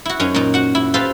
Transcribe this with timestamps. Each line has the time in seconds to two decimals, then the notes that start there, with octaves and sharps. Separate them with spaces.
0.06 E4 F#4
0.20 F#2 C#4 D#4
0.35 A#2 D#4
0.54 F#4 F#5
0.75 E4
0.94 F4 G4 A4 B4 C5 F5